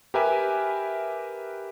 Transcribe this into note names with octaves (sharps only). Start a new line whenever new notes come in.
G4 A#4 B4 E5 G#5